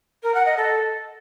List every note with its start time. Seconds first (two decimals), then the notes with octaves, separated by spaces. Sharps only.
0.23 A#4
0.34 F#5
0.45 D#5
0.57 A4